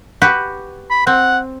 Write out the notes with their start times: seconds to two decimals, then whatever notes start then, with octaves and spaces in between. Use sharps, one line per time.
0.22 F#4 G4 B4
0.90 B5
1.07 C4 F#5